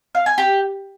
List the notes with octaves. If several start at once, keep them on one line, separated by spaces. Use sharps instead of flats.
F5
G#5
G4